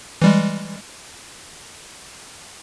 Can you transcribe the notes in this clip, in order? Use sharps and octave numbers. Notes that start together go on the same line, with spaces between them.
E3 G3 G#3